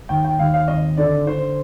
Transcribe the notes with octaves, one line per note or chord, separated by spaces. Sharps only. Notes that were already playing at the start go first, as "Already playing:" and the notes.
D#2 G5
G5
D#2 F5
F5
G#1 D#5
D3 D5
D3 C5